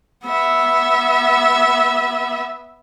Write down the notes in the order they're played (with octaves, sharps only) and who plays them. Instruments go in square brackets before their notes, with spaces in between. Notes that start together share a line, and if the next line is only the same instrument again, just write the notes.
[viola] B3 E5